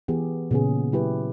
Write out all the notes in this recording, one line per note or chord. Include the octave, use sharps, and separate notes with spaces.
E3 B3 G4 G#4
A#2 C#3 B3 C#4 G#4
F#3 E4 G4 B4